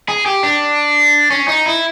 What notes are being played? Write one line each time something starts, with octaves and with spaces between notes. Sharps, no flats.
G#4
G4
D4
C#4
D#4
E4